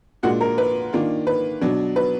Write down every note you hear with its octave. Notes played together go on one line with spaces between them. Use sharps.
A#2 G#3 D4 F4 F#4 F#5
A#4
B4
D#3 A#3 D4 F4
B4
B2 F#3 D4
B4